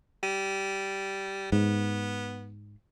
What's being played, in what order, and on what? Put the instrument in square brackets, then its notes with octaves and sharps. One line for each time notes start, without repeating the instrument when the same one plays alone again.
[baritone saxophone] G3
[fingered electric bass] G#2 [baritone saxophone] B3